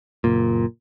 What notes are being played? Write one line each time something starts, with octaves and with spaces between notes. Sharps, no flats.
F#1 A#2